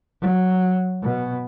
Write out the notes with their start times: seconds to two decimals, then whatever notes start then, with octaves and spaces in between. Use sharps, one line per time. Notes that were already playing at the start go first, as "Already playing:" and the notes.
0.21 F#3
1.02 B2